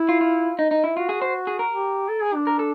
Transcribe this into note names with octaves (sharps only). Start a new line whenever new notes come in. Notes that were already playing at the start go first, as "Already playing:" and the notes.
Already playing: E4
F4
F4
D#4
D#4
E4
F4 F#4
G#4
C5
G#4
A#4
G4
A4
G#4
D4
A#4
A4